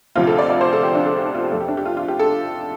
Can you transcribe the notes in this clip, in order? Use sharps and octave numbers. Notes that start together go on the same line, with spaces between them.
D2 C3 F3 F4
A4
D5
D5
C5
A4
G4
D4
A4
G4
D4
F4
G4
F2 F3 A3 A4
G4
D4
G4
F4
F4
G4
A4